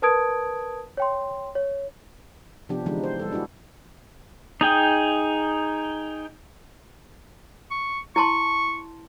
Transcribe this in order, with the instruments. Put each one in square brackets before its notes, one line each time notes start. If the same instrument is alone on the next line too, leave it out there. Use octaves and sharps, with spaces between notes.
[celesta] A#4 B4 A5 D#6 G#6 D7
C#5 G5 C6
C#5
[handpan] C3 F3 B3 D4 G4
D3 E3 F3 G#3 D4 D#4
C5
G3 A4
G#3 D4 E4 F#4 G#4
[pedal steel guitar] D#4 G#4 G5
[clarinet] C#6
[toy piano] E4 A5 C6 [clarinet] C#6